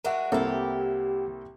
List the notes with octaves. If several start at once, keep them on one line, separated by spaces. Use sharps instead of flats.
G#3 D4 F#4 A#4 E5 F#5
C2 A#3 E4 G4 A4